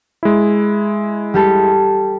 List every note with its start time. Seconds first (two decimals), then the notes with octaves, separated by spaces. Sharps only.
0.23 G#3 E4
1.34 G3 G4 A4